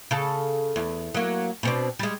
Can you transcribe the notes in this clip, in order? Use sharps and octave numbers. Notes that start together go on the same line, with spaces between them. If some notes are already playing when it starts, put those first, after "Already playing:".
C#3 A4
E2
F#3 A#3
B2 C4 D4
G3 G#3